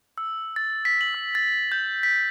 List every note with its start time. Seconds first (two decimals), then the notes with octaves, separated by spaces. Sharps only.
0.18 E6
0.56 A6
0.85 B6
1.01 F#7
1.14 E6
1.35 A6
1.72 G6
2.03 B6